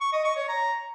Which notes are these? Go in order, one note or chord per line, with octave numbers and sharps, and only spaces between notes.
C#6
D#5
C#6
C#5
A#5